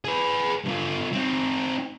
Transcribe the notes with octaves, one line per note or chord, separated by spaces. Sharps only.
G#4 B4
G2 F4
C4 D#4